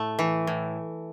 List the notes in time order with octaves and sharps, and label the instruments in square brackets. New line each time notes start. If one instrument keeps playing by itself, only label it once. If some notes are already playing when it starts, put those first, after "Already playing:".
Already playing: [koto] A2 A3
E3
A2